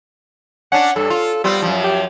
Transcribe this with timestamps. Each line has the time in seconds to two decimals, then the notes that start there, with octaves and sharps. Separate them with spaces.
0.72 C#4 D4 F#5
0.96 G2 A4
1.10 F4
1.44 G3 B3 C4 F4
1.62 F#2 F3
1.84 G4